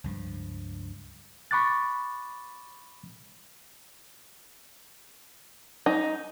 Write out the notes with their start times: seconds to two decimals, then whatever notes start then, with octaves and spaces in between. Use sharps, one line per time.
0.04 C#2 G2 F3
1.51 B5 C#6 D6 F#6 A6
5.86 D#4